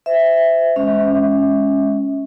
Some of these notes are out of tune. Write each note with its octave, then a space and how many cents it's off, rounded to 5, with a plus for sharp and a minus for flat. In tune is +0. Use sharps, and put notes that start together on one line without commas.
C5 -35 E5 +0
G#3 +0 C#4 +0 E5 -30